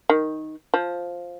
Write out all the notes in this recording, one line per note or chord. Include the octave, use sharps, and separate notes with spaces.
D#3
F3